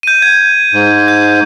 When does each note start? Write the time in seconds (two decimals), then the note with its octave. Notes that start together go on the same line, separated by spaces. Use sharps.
0.03 G6 D#7
0.22 G#6
0.73 G#2
1.08 G6